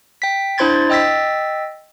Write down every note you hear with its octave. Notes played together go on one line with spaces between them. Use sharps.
G5 B6
D4 E4 C5 C6 G#6 A6
D#5 G5 E6 A6 B6